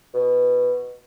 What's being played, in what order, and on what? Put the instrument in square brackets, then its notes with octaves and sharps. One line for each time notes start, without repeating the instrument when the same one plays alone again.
[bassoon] B2